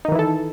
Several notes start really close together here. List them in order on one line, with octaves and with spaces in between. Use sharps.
D#4 D#3 E3 E4 A4